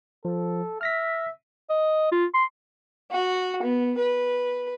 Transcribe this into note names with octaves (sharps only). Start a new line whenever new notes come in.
F3 A4
E5 F6 A#6 B6
D#5
F4
C6
F#4
B3
B4